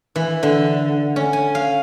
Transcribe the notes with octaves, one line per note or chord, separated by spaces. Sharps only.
E3
D3
C#4
G#5
F5